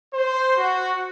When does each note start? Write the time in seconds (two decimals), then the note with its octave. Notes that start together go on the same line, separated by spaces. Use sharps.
0.14 C5
0.56 F#4